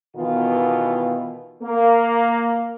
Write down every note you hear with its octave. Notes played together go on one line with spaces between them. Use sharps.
B2 D#3 E3 B3 F4
A#3